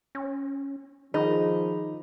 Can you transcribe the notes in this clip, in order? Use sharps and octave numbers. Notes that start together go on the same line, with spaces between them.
C#4
D#3 F3 D#4 G#4 B5